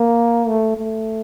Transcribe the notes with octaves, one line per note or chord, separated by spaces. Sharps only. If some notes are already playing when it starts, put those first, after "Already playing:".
Already playing: A#3
A3
A3